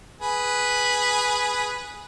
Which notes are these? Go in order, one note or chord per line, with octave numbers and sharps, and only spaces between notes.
G#4 B4